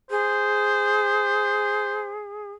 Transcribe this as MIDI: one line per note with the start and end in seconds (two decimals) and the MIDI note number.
0.11 2.52 68
0.11 2.14 72